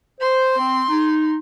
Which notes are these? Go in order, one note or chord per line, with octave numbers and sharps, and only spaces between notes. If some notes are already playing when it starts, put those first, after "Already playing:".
C5 C6
C4
D#4